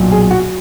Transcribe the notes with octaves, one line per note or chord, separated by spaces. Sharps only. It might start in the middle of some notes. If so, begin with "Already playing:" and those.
Already playing: B1 A#2 F#3
G#4
F#4